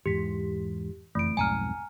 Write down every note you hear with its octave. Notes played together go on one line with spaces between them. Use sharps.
E2 G#2 E3 G4 B6
F#1 F2 E3 A3 D7
B1 F2 G#2 G#5 A#5 F6